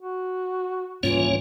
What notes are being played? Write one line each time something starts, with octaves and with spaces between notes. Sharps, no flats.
F#4
C2 G#2 E3 G3 A#3 C#4 F4 C#5